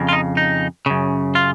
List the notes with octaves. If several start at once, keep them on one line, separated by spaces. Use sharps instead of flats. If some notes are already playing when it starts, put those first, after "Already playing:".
Already playing: F2 C#3
F4
D#4
D#4
F#2 C#3
F4